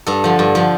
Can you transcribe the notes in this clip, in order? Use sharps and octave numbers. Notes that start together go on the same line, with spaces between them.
G2 A4
D3 F3
G2
D3 F3